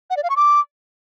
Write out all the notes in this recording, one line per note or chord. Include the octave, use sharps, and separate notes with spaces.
F#5
D5
F5
C#6
D6